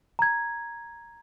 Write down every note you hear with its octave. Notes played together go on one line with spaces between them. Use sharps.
A#5 G#6